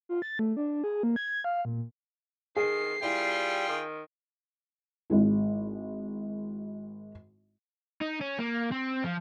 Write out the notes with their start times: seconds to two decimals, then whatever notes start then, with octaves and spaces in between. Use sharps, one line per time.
0.09 F4
0.22 A6
0.39 A3
0.57 D4
0.84 G#4
1.03 A#3
1.16 G#6
1.44 F5
1.65 A#2
2.56 D#3 G#4 C7
3.03 G3 E4 F4 G#4 G5
3.69 D#3
5.10 G#1 G#3 E4
8.02 D#4
8.21 C#4
8.39 A#3
8.72 C4
9.04 F3